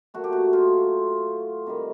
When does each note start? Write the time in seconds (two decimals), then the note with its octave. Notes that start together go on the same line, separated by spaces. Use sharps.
0.14 A#2 F#3 A3 F#4
0.24 G4
0.33 F#4
0.53 F4
1.66 C3 D#3 G3